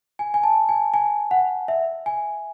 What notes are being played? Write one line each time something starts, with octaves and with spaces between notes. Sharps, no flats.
G#5
G#5
A5
G#5
G#5
F#5
E5
G#5